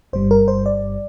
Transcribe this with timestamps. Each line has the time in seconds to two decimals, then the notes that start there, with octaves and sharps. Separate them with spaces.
0.13 G1 G2 G3 C5
0.31 A#4
0.48 C5
0.66 D5